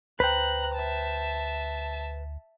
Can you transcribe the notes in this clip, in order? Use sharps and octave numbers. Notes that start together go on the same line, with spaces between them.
D2 B4 C5 G5 A#5 F#6
E5 A5